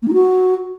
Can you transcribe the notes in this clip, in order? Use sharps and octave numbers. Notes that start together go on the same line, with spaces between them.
A#3
D#4
F#4